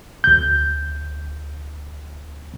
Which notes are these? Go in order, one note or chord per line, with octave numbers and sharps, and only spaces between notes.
D2 G6